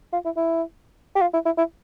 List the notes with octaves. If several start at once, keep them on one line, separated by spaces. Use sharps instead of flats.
F4
E4
E4
G4
F4
E4
E4
E4